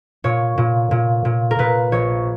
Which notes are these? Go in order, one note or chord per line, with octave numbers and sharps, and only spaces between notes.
A#2 C#5
A#2
A#2
A#2
A#4
A#2 B4
A#1 C#5